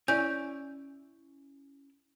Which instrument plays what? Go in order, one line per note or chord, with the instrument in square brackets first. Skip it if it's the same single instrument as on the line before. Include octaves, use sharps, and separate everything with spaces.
[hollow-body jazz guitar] C#4 E4 D5 [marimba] G#5 G6